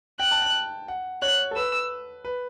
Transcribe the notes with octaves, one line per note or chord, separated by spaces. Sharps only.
G5 F#6
A5
G5
F#5
C#5 F#6
A4
B4 E6
B4